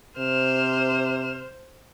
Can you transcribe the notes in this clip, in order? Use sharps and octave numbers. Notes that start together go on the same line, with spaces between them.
C3 C5 F6 E7